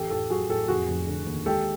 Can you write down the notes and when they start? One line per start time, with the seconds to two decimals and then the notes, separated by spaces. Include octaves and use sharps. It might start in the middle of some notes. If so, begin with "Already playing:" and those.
Already playing: A1 G4 A4
0.10 A2 G4 A4
0.30 F#3 F#4 G#4
0.49 A2 G4 A4
0.68 F1 F#4 G#4
0.88 F1
1.07 D3
1.27 D#2
1.46 G#3 G4 A4